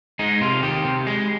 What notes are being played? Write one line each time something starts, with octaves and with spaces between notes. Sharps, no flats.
G#3 D#4
C3 F4
D#3 G4
C3
G#3